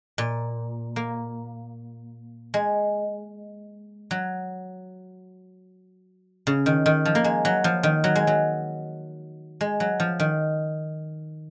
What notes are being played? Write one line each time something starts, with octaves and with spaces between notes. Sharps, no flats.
A#2
A#3
G#3
F#3
C#3
D#3
D#3
F3
A#3
G#3
F#3
F3
D#3
F#3
G#3
F#3
G#3
F#3
F3
D#3